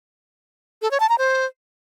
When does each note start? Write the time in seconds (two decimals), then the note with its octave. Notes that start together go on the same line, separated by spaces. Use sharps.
0.82 A4
0.91 C#5
1.00 A5
1.09 A#5
1.18 C5